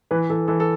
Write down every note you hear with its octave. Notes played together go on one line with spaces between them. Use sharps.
E3 B4
E3 A4
E3 A4
A4